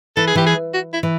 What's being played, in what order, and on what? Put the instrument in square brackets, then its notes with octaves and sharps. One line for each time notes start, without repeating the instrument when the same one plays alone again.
[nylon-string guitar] E3 [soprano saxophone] A4
[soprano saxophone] G#4
[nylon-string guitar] E3 [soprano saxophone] G4
[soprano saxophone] G#4
F#4
E4
[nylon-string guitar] E3